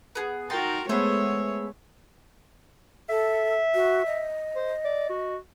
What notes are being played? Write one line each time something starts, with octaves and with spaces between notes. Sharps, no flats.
B3 G#4
D#4 F#4 A#4 G5 C6 A6
G#3 A3 B3 G#4 C5 C#5 E5
A4 E5
F#4
D#5
C5
D5
F#4